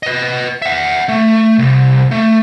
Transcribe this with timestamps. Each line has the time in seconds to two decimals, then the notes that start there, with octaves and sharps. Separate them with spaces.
0.03 B4 D#5
0.62 E5 F#5
1.09 A3
1.59 C2
2.11 A3